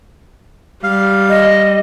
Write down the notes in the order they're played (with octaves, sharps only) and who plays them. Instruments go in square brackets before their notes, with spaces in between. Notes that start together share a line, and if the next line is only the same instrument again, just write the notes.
[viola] G3 [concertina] F5
[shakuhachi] D#5